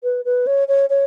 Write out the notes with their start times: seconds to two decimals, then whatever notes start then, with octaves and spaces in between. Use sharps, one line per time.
0.03 B4
0.25 B4
0.47 C#5
0.68 C#5
0.90 C#5